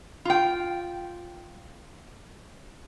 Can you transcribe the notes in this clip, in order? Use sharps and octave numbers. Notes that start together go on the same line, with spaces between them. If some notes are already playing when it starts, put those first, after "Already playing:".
F4 G5